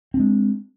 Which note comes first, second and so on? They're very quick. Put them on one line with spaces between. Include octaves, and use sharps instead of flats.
C4 D4 G#3